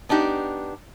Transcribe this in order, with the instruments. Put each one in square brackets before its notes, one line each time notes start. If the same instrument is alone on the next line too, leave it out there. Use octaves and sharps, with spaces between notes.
[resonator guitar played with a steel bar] B3 D4 D#4 G4